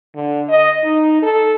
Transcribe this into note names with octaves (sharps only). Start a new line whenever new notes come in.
D3
D#5
D#4
A4